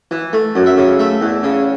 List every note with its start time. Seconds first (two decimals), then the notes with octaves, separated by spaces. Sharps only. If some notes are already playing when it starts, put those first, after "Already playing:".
0.11 E3
0.33 A3
0.55 F#2
0.66 E5
0.77 C#3
0.99 A3 E5
1.21 E2
1.43 C#3